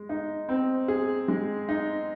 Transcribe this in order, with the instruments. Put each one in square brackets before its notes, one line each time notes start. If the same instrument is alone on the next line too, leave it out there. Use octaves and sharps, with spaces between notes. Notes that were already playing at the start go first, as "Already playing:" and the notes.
Already playing: [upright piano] G#3
D#4
C4
G#4
G#3
D#4